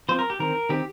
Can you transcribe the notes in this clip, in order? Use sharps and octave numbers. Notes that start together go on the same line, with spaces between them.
F3 C4 C5
A#4
G4
D#3 C4 A#4
D#3 C4 G4